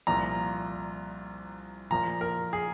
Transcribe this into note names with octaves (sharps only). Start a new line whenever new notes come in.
C2 A#2 F3 A#3 A#5
A#2 F3 A#3 A#5
A#4
G#4